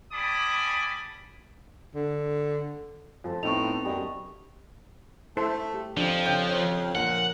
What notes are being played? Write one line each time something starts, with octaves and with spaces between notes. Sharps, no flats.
G3 G#5 A5 B5 D6 D#6
D3
F2 F4 A4 C5
A2 B3 C4 D#4 E5 C#6 F7
F#2 G3 D#5
A3 E4 A4 C5
G4
F2 F3 D4
C#3 D4 C#5 G5
C#5
A#2 F3 A#3 D4 F#5